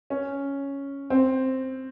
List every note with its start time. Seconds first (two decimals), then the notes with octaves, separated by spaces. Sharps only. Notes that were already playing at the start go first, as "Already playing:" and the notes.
0.10 C#4
1.10 C4